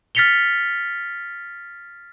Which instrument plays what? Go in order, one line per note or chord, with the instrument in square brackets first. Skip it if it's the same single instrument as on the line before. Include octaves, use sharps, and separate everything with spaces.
[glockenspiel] F6 A6 B6 C#7 F7 G7